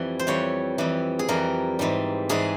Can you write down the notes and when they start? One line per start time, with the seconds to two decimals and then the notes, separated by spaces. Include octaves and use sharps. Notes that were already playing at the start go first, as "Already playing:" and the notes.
Already playing: F2 E3 G3
0.19 C5
0.27 F2 E3 G3 C#5
0.78 F2 E3 G3
1.19 G#4
1.29 F2 E3 G3 A#4
1.79 G#2 E3 G3
2.29 G#2 E3 G3 G#4